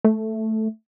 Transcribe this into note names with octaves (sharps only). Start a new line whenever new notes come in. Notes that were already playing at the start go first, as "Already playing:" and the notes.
A3